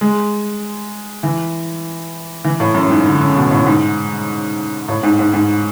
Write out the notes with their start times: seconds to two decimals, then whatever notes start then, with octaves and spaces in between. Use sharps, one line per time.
0.01 G#3
1.23 E3
2.45 E3
2.60 A2
2.74 F#2
2.90 G#2
3.06 D3
3.21 C#3
3.35 B2
3.51 A2
3.67 G#2
4.88 A2
5.03 G#2
5.19 G#2
5.34 G#2